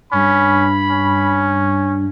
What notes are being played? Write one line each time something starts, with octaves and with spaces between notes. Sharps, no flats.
G2 C#4 B5
C#4